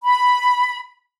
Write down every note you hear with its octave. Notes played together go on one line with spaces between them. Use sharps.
B5